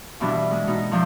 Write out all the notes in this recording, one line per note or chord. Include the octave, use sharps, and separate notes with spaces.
G2 B2 E3 D4
G#3
B2 D#4
E2 F3 D4 G6